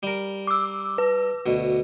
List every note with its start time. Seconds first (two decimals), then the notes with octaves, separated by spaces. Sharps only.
0.03 G3 A#4
0.47 D6 E6
0.98 B4
1.46 D2 B2